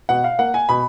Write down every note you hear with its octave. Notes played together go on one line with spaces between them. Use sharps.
B2 F#5
F5
A#3 F#5
G#5
B2 B5